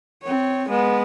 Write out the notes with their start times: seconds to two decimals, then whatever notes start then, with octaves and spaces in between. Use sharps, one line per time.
0.23 C4 C#5
0.68 G#3 B3